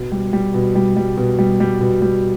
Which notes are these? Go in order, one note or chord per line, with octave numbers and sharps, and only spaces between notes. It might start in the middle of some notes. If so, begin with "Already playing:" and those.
Already playing: B2
G3
G3
B2
G3
G3
B2
G3
G3
B2
G3